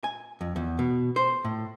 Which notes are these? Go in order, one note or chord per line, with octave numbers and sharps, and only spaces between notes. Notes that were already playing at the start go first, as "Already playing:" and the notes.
G#5
F2
E2
B2
C5
A2